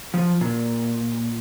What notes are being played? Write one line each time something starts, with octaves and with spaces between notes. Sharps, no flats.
F3
A#2